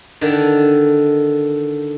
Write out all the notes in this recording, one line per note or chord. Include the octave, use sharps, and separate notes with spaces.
D3 D#3